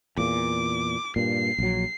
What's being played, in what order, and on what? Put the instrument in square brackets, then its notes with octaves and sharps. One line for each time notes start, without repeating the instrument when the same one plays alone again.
[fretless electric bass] E2 A#2 [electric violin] D6
[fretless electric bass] G2 A#2 [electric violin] C7
[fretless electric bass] A#1 F#3